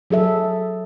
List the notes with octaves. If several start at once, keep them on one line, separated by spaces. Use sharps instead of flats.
F#3 G#4 A4 E5